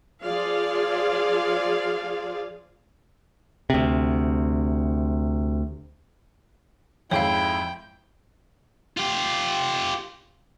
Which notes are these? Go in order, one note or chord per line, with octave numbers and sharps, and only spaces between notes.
F3 F4 G#4 D5 F5
D2 C3
F2 G#2 E4 C#5 F5 G5
F4 G4